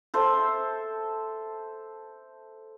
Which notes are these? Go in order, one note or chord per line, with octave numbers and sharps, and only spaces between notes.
A4 C5 E5